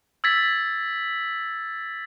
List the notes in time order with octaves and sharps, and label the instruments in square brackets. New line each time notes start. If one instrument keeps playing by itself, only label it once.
[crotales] E6 G#6 A6 B6